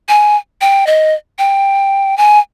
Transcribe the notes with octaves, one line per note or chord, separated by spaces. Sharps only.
G#5
G5
D#5
G5
G#5